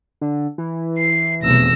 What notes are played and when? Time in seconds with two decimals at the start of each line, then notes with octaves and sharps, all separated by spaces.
0.21 D3
0.58 E3
0.98 C7
1.43 F1 B1 E2 E6 A#6